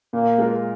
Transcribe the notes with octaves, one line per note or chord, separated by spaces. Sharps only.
A#2 A#3
G#3 F4 A#4